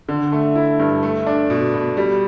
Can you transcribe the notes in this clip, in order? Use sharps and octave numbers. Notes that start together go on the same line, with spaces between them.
D3
A3
E4
G2
A3
D4
B2
B2
G3